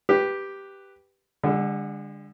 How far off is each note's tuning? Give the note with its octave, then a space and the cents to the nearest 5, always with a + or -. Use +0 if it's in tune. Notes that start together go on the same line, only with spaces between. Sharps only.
G4 +0 B4 +0
D3 +0 G#3 -45